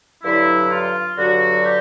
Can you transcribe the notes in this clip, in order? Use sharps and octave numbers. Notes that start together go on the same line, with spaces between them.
G2 D3 F#3 E4
F4
G2 D3 F#3 F#4
G4